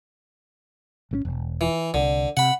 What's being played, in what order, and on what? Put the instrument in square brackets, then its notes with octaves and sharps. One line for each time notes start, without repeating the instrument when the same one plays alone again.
[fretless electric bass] G#1 C3 C#4
E1
[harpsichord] E3
[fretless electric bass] C2 [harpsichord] D3
[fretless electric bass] C3 [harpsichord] F#5 B5